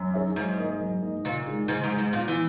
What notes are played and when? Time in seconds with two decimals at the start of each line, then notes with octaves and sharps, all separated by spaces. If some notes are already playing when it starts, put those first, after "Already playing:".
Already playing: F#2
0.14 D#4 G#4 C#5 E5
0.36 G#2 F#3
0.58 A#3 D#4 A#4 D#5
0.80 F#3
1.02 A#3 D#4 A#4 D#5
1.25 A#2 C#3
1.47 G#3 D#4 G#4
1.68 G#2 C#3
1.83 G#2
1.91 G#3 D#4 G#4
1.98 G#2
2.13 A#2 B3
2.28 E3